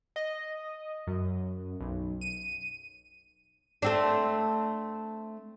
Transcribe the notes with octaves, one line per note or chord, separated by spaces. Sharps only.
D#5
F#2
B1
D#7
A3 C4 D4